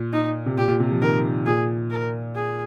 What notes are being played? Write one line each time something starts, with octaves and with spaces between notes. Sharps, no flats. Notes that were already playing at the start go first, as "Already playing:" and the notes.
Already playing: A#2
D#4
C3
A#2 G4
A#2
C3
F3
D#3 A#4
A#2 G#4
A#4
G#4